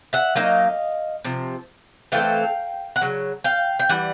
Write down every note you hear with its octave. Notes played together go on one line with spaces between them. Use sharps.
E5 F#5
F#3 A#3 D#4 D#5 F5
C3 F3
E3 A3 C4 F5 G5
F#5
C#3 F#3
F5 G5
G5
E3 G3 F#5